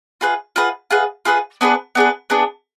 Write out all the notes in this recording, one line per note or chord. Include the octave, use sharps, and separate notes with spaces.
F4 G#4 B4 F#5
F4 G#4 B4 F#5
F4 G#4 B4 F#5
F4 G#4 B4 F#5
B3 D4 G#4 B4
B3 D4 G#4 B4
B3 D4 G#4 B4